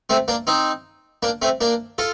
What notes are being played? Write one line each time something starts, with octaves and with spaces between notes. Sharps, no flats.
A3 C4
A#3 D4
C4 D#4
A#3 D4
A3 C4
A#3 D4
F4 A4